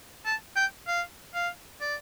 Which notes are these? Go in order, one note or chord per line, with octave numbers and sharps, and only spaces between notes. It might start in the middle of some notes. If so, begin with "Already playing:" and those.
A5
G5
F5
F5
D5